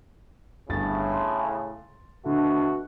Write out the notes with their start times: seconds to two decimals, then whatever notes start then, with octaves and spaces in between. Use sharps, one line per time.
0.69 G1 A2 C#3 A6
1.13 C6
2.26 B2 D3 A3 F#4